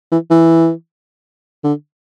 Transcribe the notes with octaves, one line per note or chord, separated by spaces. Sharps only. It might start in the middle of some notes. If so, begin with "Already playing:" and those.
E3
E3
D3